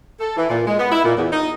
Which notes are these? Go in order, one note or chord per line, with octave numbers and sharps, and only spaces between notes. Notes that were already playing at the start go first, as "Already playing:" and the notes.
A4
E3
A#2
G#3
B3
E4
A#2
E2
D#4